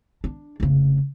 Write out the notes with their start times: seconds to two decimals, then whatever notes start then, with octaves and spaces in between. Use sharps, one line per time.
0.24 D4
0.60 F1 C#3